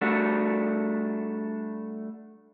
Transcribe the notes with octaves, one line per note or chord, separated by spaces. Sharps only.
G3 A3 D4 F#4